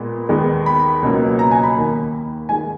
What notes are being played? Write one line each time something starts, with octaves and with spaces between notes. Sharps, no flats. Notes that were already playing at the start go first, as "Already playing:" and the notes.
Already playing: A#2 G#3 B3
D#2 D#3 G#3 B3
B5
C#2 B2 F#3 A#3
A#5
G#5
B5
D#2 D#3 A#3
G#2 D#3 G#3 G#5